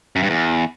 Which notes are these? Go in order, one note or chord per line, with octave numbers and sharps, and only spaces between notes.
F#2
G2
E2